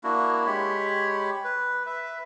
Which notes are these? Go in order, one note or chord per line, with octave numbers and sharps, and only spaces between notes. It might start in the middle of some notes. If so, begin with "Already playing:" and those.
A#3 D4 E4 F#4
G#3 G4 C#5 B5
B4
B4 E5